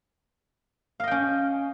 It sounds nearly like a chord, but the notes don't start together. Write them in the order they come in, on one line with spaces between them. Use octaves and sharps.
F5 D#5 G5 C#4